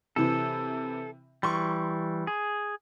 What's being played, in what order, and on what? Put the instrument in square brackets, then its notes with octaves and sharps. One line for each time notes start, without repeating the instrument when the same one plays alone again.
[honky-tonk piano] C3 E3 [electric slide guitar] A4
[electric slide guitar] E3 G3 [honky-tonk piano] C6 C#6
[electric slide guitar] G#4